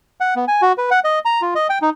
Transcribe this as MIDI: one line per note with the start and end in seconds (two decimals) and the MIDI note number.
0.20 0.34 78
0.36 0.45 59
0.48 0.61 80
0.62 0.72 66
0.78 0.90 71
0.91 1.00 78
1.04 1.19 75
1.25 1.41 82
1.41 1.54 65
1.55 1.67 75
1.70 1.79 79
1.82 1.90 63